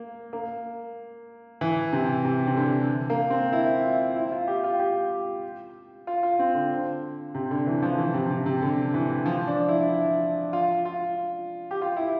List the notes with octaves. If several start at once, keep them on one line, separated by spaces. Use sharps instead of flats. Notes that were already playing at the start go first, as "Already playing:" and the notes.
Already playing: A#3
A#3
E3
C3
C3
C3
D3
A#3
C4
E4
F4
E4
F4
G4
F4
G4
F4
F4
C4
D3
C3
D3
E3
F3
E3
C3
C3
C3
D3
E3
F3
D4
E4
E4
F4
F4
G4
F4
E4